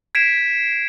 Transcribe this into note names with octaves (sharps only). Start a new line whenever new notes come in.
G#6 B6 C7 D7 E7